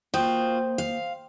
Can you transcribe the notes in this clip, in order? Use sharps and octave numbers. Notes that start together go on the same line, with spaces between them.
A#3 F4 F#4 C5 G5 D#6
F5